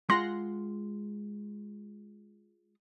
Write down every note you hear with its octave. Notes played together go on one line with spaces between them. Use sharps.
G#3 F4 F#5 C6 F#6 A#6